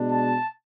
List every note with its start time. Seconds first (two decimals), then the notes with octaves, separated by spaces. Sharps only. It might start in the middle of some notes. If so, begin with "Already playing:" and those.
Already playing: B2 G#3 D4
0.11 A5